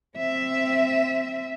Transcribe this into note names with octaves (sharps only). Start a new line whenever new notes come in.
C4 E5